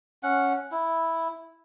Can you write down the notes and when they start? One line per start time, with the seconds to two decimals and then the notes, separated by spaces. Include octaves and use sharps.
0.23 C#4 F#5
0.71 E4